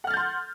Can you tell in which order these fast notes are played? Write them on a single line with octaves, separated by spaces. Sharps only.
F#5 F6 A6 G6 C6